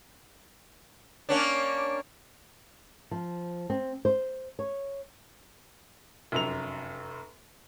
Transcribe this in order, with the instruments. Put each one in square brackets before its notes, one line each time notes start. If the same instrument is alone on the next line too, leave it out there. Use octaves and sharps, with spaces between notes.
[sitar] A#3 C#4 D4
[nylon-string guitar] F3
C4
C5
C#5
[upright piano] F1 F#2 F7